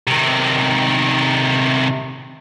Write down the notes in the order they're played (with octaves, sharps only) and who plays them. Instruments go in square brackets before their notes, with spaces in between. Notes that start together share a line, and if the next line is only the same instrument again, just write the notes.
[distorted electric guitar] C3 D#3